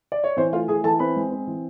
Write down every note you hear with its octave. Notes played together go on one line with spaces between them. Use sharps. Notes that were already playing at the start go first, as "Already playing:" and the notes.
D5
C#5
E3 C4 C5
A3 F4 F5
E3 G#4 G#5
E3 A4 A5
C4 B4 B5
G#3
C4
E3